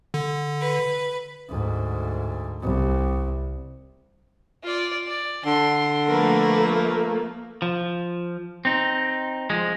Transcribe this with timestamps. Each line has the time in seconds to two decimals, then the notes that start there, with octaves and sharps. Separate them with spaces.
0.14 D3
0.61 B4
1.49 D2 G#2
2.62 C2
4.63 F4 D5
5.07 D5
5.45 D3 C6
6.07 F3 A3 A#3 A#4 B4
7.62 F3
8.65 C4 D#4
9.50 F3 G#3